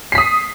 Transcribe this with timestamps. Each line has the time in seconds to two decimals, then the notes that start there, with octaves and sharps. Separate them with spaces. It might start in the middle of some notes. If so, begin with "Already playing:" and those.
0.12 C7
0.15 B6
0.18 D#6